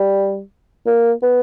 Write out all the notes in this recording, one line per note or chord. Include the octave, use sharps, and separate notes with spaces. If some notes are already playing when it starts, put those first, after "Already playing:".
Already playing: G3
A#3
B3